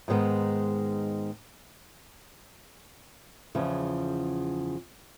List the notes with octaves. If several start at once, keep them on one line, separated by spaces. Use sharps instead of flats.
G#2 D#3 G#3 B3
E2 C#3 F3